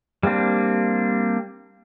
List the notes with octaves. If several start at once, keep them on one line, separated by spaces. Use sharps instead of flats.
G3 A#3 C4 D4